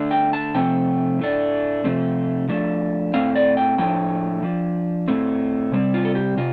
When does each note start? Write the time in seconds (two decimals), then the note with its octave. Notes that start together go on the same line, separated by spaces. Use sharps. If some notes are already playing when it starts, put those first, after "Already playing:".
Already playing: D3 A3 D4
0.11 G5
0.33 A5
0.54 C3 F3 A3 C4 G5
1.19 A2 A3 D4
1.84 C3 F3 A3 C4
2.48 F3 A3 D4
3.14 A2 A3 C4 F5
3.35 D5
3.57 G5
3.78 A2 F3 A3 D4 G5
4.43 F3 D4
5.08 A2 A3 C4
5.72 C3 G3 C4
5.94 F4
6.05 A4
6.15 G4
6.37 C3 F4